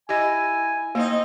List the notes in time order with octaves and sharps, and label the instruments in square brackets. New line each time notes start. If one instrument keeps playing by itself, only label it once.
[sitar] E4 [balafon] G4 D#5 [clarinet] G#5
[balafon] A#3 [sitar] C4 D#4 D#5